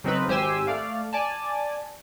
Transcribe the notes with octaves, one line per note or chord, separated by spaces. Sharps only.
C#3 F#3 C4 D#4 A#4 B4
G#1 G4 C5 G#5 E6
A3 D5 F5
D5 G#5 A5